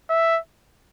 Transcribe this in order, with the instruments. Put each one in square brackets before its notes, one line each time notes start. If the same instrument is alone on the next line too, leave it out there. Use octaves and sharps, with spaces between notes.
[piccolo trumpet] E5